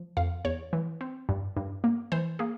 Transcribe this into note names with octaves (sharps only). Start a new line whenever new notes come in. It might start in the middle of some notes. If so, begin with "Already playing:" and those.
Already playing: F3
F2 F5
E2 C#5
E3
C4
G2
G2
A#3
E3 C5
A#3 G#4